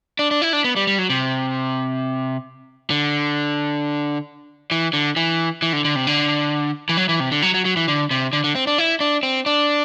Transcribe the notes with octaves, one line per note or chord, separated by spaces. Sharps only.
D4
D4
E4
D4
B3
G3
G3
F#3
C3
D3
E3
D3
E3
E3
D3
D3
C3
D3
E3
F#3
E3
C3
D3
F#3
F#3
F#3
E3
D3
C3
D3
D3
C4
D4
E4
D4
C4
D4